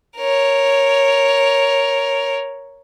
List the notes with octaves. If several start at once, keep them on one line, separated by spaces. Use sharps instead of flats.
A#4 C#5